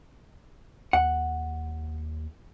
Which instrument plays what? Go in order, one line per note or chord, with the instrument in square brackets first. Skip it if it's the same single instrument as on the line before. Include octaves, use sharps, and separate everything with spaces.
[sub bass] D#2 [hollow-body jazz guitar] F#5